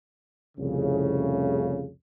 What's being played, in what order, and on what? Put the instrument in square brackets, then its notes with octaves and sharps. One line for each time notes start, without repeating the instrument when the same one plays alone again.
[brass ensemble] C2 F2 A2 C#3